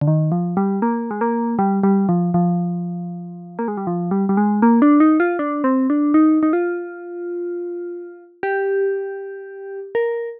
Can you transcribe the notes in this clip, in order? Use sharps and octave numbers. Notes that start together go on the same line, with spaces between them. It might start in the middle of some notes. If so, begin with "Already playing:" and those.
D3
D#3
F3
G3
A#3
G#3
A#3
G3
G3
F3
F3
A#3
G#3
G3
F3
G3
G3
G#3
A#3
D4
D#4
F4
D4
C4
D4
D#4
D#4
F4
G4
A#4